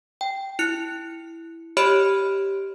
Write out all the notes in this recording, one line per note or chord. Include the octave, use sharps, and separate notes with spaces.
G5
E4 F#6 C#7
G4 C#5 D#5 B5 F6 D7